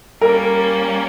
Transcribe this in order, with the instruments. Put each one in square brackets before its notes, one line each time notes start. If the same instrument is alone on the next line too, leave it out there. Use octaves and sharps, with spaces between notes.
[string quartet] G3 A#3 C#4 [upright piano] A#4